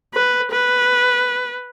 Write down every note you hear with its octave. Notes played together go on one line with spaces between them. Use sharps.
B4
B4